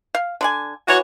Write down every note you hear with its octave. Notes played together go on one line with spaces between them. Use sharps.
F5
D3 D5 G#5
E3 F#4 C#5